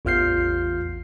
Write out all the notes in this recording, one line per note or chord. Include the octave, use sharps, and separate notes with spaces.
A1 E2 F4 F6 G6 C7